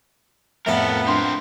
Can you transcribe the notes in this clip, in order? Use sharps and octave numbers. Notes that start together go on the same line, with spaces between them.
F2 A2 B3 A4 A#4 E5 F5
C4 D4 A#4 C6